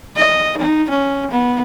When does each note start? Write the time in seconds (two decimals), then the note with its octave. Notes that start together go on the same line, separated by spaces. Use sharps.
0.17 D#5
0.58 D#4
0.90 C#4
1.31 B3